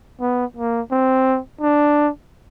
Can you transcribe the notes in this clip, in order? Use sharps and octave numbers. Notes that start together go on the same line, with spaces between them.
B3
A#3
C4
D4